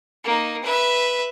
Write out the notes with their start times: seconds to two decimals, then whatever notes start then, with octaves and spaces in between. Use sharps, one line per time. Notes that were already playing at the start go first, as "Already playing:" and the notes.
0.24 A#3 D#4
0.64 B4 E5